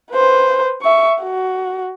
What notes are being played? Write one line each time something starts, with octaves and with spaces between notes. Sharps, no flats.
B4 C5
E5 C#6
F#4